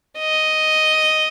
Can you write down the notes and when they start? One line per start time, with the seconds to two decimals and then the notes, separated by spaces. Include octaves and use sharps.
0.19 D#5